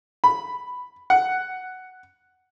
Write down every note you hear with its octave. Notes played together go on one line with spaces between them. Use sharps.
B5
F#5